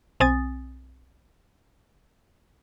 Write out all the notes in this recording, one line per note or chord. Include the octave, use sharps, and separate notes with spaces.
B1 C4 G#5 D#6 A6